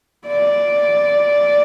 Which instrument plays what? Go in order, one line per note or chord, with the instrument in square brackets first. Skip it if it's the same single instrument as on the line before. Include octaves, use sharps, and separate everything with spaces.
[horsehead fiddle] D5